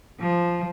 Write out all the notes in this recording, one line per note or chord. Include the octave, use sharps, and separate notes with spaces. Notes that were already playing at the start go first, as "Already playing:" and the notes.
F3